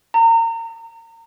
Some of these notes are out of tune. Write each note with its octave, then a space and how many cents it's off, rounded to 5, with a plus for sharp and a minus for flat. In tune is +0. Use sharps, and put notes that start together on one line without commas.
A#5 -30